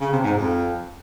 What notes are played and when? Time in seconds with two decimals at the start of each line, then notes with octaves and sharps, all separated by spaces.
0.01 C#3
0.12 C3
0.24 G#2
0.36 F2